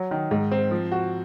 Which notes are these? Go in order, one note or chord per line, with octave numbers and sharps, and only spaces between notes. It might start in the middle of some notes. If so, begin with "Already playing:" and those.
Already playing: F#3
D#3
G#2
C4
F3
F#4